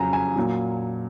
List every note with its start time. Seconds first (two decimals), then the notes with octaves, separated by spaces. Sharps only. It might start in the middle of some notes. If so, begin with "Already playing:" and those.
Already playing: F2 C#3 F#3 G#5 A#5
0.13 G#5
0.36 A#2 F#3